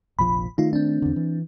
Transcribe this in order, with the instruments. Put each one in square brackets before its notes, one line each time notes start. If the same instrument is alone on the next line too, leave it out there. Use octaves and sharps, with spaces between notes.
[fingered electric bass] F1 A#1 F3 [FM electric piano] B5
[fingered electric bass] D#3 A3 [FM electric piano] D#4 F4
[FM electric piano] C4 D4
[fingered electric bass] E2 D3
E3